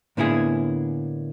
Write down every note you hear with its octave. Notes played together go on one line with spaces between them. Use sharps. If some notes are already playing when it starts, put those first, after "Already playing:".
A2 D3 A#3 B3 E4 G#4